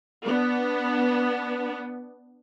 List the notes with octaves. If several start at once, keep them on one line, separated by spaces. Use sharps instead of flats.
B3 D4